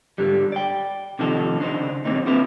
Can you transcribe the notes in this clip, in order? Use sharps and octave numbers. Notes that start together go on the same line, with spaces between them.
G#2 D3 G3
D5 G5
C3 D#3 F3 D#4 A4
C#3 D4 D#4 C5
B1 D#3 A#3 C4 D#4
C4 D4 E4 F4 A#4 B4